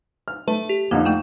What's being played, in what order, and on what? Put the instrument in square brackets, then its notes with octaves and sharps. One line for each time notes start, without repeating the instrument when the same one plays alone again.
[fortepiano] F6
[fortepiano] A3 [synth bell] B4
[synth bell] G4
[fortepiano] F2 D3 D#4 [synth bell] A#3
[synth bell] A3 G5 E7